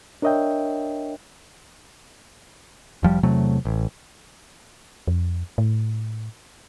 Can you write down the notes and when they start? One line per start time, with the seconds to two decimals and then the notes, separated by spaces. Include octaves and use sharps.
0.22 D4 A#4 C#5 D#5 E5 G5
3.03 F1 F3 G3
3.23 E2 C3 F#3 A3
3.65 A1
5.08 F2
5.58 A2